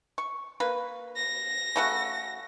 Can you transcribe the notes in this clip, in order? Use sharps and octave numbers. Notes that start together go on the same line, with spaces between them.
C#6
A#3 B4
A#6
C#3 A3 F#4